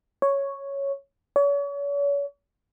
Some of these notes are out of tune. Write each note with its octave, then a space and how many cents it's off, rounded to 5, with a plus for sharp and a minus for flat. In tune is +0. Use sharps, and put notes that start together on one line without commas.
C#5 +0
C#5 +40